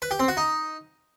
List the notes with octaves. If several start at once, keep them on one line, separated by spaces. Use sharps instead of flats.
B4
G4
C4
F#4
D#4